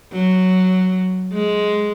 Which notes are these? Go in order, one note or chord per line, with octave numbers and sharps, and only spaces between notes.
F#3
G#3